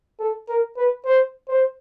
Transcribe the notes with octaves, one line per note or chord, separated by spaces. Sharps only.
A4
A#4
B4
C5
C5